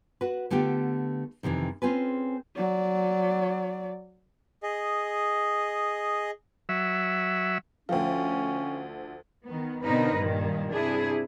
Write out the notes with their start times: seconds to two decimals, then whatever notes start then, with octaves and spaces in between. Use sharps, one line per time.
0.21 F#4 B4
0.50 D3 A3 B3 F4 G4
1.43 F2 C3 D#3 E3
1.82 C4 C#4 F4 G#4 A4 B4
2.56 F#3 D5
4.63 G#4 D#5
6.69 F#3 E5
7.89 D2 F3 C#4 F5 G5
9.46 D#3 B3
9.82 B2 D3 C4 D#4 A#4 B4
10.16 G2 A#2 D#3
10.73 C3 D4 E4 G#4